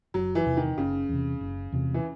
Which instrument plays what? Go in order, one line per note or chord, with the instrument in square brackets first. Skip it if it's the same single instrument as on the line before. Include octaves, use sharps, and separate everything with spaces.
[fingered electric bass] F#1 [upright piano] F#3
[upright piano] E3
[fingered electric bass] E2 C3
[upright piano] D#3
[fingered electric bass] F#1 [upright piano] C#3
[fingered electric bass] E2 C3
F#1
E2 C3
[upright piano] E3